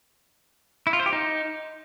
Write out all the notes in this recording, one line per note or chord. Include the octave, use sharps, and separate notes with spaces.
E4
F4
C5
G4
D#4